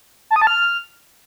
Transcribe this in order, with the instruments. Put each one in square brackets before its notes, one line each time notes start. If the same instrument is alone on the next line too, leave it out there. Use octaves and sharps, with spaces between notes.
[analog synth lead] A5
D#6
A5
F6